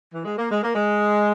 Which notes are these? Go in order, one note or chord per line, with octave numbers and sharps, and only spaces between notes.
E3
G#3
A#3
G#3
A#3
G#3